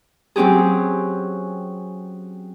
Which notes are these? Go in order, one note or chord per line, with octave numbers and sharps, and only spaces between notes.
F#3 C4 C#4 G4 G#4